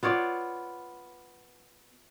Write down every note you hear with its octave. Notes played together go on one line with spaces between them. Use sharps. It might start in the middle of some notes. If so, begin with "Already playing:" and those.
B3 F4 C#5 D5